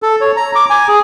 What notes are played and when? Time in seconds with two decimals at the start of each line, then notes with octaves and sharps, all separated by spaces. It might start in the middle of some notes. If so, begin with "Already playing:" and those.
0.03 A4
0.21 C#5
0.36 A#5
0.55 D6
0.70 G#5
0.88 G#4